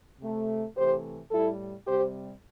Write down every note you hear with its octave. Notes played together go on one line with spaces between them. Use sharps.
C3 A3
C3 E3 A3 G4 C5
A2 G3 E4 A4
C3 G3 G4 C5